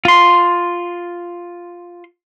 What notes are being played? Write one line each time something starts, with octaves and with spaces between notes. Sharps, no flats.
F4 C6